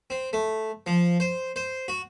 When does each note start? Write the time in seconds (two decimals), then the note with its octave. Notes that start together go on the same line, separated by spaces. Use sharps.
0.10 C4
0.33 A3
0.86 F3
1.20 C5
1.56 C5
1.88 F#4